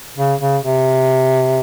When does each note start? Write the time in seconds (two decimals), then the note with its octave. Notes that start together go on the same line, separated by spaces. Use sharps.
0.18 C#3
0.41 C#3
0.64 C3